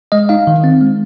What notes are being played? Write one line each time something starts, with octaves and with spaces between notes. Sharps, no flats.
G#3 D#5
D#4 F5
D#3
C4
G#3